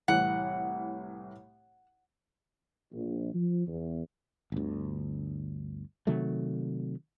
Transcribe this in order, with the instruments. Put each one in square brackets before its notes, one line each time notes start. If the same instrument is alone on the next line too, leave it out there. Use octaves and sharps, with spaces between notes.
[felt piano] C2 A2 E3 [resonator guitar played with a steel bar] F#5
[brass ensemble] A#1
F3
E2
[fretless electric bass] G1 D2
C3 D#3 F#3 A3